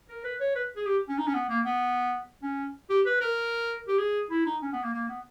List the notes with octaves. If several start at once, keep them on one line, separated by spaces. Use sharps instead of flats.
A#4
B4
C#5
B4
G#4
G4
C#4
D#4
C#4
B3
A#3
B3
C#4
G4
B4
A#4
G4
G#4
E4
D#4
C#4
B3
A#3
A#3
B3